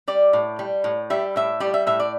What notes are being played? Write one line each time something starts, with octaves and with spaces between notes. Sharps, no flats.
G3 D5
A2
G3
A2
G3 E5
A2 E5
G3 D5
E5
A2 E5
D5